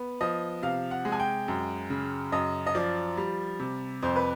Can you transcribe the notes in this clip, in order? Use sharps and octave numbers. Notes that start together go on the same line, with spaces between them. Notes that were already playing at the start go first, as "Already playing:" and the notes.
Already playing: B3
F3 D#5
C3 F5
F#5
G#3
G#5
G5
F#2
C#3
F#2 D#5
D#5
F3 D5
G3
C3
F2 C5
B4